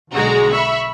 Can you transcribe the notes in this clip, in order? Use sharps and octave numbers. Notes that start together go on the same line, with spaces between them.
B1 D3 G#3 F#4 A#5
E5 B5 C#6